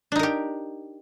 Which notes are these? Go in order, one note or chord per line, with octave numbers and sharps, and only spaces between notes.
D4 D#4 G4 A#4